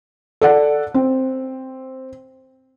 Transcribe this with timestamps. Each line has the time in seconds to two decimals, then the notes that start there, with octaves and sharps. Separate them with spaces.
0.41 A4 D5 F#5
0.94 C4